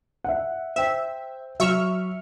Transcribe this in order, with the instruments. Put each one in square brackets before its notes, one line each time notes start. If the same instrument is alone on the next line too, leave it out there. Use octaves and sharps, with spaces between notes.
[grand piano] E5 F#5
[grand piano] C5 G5 [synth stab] E5
[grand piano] F#3 [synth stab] E5 C#6 F6